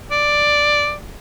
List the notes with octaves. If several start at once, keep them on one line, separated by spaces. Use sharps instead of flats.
D5